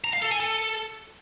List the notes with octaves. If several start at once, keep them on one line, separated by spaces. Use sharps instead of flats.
A#5
F5
A4
G#5
A4